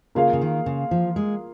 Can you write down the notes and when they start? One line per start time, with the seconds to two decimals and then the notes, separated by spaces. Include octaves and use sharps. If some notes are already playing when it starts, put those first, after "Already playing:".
0.15 C#3 A#3 F4 G#4 F5
0.33 C#3
0.41 D#3
0.66 C#3
0.91 F3
1.16 G#3